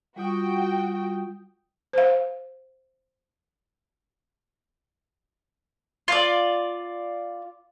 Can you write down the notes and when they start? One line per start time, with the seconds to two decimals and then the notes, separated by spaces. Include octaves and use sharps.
0.16 G3 F4 F#4 G5 D#6
1.93 C5 F5
6.08 F4 D5